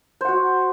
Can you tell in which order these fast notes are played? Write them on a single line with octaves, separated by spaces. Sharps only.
C5 F#5 F#4